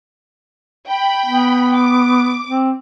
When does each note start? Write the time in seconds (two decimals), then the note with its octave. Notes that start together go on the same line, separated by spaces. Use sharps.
0.88 G5 B5
1.26 B3
1.75 D6
2.48 C4